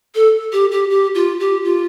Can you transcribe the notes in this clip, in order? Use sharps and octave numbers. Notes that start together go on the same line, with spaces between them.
A4
G4
G4
G4
F4
G4
F4